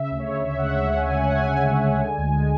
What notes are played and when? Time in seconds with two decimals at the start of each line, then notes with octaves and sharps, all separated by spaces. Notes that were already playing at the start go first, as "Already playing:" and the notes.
Already playing: C#3 E5
0.11 D2
0.19 C#5
0.28 C#3
0.45 C#3 E5
0.58 G#3 F#5
0.71 E5
0.80 D2 F#5
0.96 C#3 G#5
1.10 C#3 G#5
1.23 F#5
1.31 C#3 G#5
1.48 C#3 G#5
1.65 D2
1.84 G#3
2.00 D3
2.18 D2
2.35 G#3